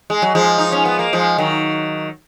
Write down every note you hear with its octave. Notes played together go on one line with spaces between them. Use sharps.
G#3
F#3
F3 G#3
D#4
C#4
B3
A#3
F3 G#3
D#3 F#3